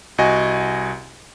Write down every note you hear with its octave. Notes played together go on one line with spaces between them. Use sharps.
C2 F#4 D#5 G#5